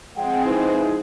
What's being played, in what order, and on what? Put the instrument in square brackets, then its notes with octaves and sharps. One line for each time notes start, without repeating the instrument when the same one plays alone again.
[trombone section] F3 G#3 G#4 [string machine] C4 [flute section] F#5 G5
[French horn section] D#4 E4 [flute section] B4 C5